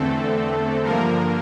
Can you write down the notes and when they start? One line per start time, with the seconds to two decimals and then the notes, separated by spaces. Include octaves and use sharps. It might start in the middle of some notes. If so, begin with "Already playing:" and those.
Already playing: E2 D3 A3 C4 A4
0.84 G2 D3 F3 A#3 A#4